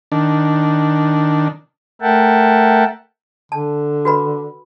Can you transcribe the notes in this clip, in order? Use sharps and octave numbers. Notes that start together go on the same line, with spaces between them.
D#3 D4
A3 A#4 E5 F#5 G5 A5
D3 A5
F#4 B4 B5